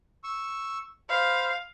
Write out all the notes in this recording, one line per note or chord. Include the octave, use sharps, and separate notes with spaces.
C#6 E6
C5 F5 B5